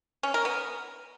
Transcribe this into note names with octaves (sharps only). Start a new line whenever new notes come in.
C#4
A#4
B3